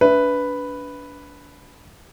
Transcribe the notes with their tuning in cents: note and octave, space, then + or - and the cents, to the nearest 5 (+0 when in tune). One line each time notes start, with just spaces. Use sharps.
D4 -30 B4 +0 E5 +0